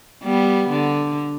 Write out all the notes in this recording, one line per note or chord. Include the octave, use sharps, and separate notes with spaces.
G3 B3
D3